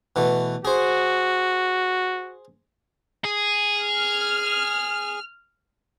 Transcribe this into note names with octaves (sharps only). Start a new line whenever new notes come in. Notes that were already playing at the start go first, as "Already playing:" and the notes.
B2 E3 A3
F#4 G#4 C5
G#4
F6